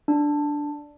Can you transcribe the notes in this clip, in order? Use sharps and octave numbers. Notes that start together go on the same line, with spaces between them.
D4